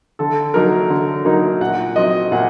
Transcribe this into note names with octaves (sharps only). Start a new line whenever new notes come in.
D3 A4
F#3 A#3 D#4 A#4
D3
F#3 A#3 D#4
A#2 F#5
F#3 C4 D#5
A#2 F#5